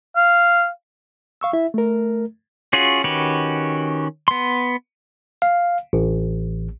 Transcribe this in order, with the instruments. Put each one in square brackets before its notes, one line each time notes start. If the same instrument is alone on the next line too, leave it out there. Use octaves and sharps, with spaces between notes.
[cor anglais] F5
[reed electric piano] F5 C#6 E6
E4 E5
A3 A#4
[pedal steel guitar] C#4 F4 F#4 G#4
D#3 C#4 F#4 G4 B4
B3 C6
[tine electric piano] F5
A1